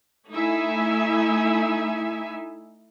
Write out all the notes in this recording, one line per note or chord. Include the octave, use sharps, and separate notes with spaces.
A3 D#4 E4 E5 G#5